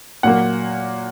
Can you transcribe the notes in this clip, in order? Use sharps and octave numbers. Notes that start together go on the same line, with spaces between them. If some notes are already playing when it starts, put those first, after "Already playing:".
A#2 F#3 A#3 F#5